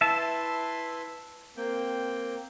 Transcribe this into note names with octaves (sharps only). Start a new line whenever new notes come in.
E4 B4 E5 A5 C6
A#3 C4 G5